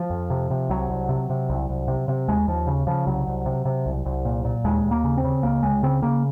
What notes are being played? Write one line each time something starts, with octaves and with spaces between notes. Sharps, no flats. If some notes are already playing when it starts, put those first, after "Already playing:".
Already playing: F3
F2
C3
C3
C2 F#3
C2
C3
C3
C2
C2
C3
C3
D#2 G#3
D#2 F3
C#3
C#3 F3
C2 F#3
C2
C3
C3
C2
C2
A#2
A#2
D#2 G#3
D#2
A#3
C#3
C4
C#3
C#2 A#3
C#2 G#3
C#3 C4
C#3 A#3